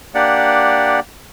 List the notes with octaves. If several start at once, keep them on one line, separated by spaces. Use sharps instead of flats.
A#3 D4 G4 D5 F#5